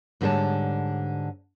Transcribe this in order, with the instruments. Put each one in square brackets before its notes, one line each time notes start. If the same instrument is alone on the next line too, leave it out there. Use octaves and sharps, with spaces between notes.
[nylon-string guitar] G#2 D3 G3 C5 C#5 A5